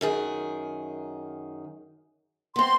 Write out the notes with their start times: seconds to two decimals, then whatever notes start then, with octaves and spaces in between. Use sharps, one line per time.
0.01 F#2 D#3 G#4
2.56 B3 C4 C6